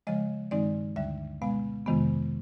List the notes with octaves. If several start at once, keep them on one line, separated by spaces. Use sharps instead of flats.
C#3 F3 G#3 D#5
G2 D#3 G#3 C4 D#4 D5
D2 D3 G3 E5
B2 G#3 B3 F5
F2 C3 D#3 G#3 B3